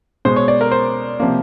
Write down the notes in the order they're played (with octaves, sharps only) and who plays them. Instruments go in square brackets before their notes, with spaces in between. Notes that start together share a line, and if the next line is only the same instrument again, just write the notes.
[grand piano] B2 G#3 C5
C#5
D5
A#4
C5
C3 F3 A#3